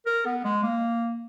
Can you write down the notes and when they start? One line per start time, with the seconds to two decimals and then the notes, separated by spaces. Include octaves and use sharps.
0.06 A#4
0.25 B3
0.44 G#3
0.63 A#3